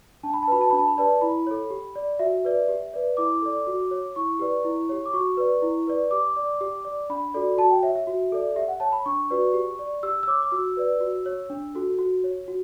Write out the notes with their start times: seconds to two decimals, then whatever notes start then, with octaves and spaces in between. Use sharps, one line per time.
0.23 D4 A5
0.34 B5
0.43 A5
0.48 F#4 B4 B5
0.61 A5
0.70 D4 B5
0.78 A5
0.88 B5
0.98 G4 B4 D5 A5
1.21 E4 B5
1.47 A4 C#5
1.70 G4
1.96 D5
2.19 F#4 E5
2.45 B4 D5
2.68 G4
2.94 B4 D5
3.17 E4 D6
3.42 A4 D5
3.67 F#4
3.91 C#5
4.16 E4 C#6
4.39 G4 B4 D5
4.65 E4
4.89 G4 C#5
5.06 D6
5.13 F#4 C#6
5.37 B4 D5
5.62 E4
5.87 B4 D5
6.11 G4 D6
6.36 D5
6.61 G4
6.85 D5
7.10 D4 B5
7.34 F#4 A4 D5
7.58 F#4 A5
7.70 G5
7.83 C#5 E5
7.95 E5
8.07 F#4
8.32 A4 D5
8.56 G4 E5
8.68 F#5
8.80 C#5 A5
8.92 B5
9.06 D4 C#6
9.30 F#4 B4 D5
9.54 G4
9.79 D5
10.03 G4 E6
10.23 E6
10.27 C#5 D6
10.42 D6
10.51 F#4 E6
10.77 B4 D5
11.00 F#4
11.26 C#5
11.50 D4
11.75 F#4 A4
11.99 F#4
12.24 C#5
12.48 F#4